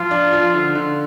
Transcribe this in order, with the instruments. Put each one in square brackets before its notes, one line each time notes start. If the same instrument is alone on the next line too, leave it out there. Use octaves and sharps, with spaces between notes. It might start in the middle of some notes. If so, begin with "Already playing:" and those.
Already playing: [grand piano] F3 [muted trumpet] F4
[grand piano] D4
F3
D3
D3